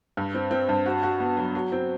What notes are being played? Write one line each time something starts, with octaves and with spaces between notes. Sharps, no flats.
G2
C4
C4
G2
F#4
F#4
B3
F#3
F#3
C4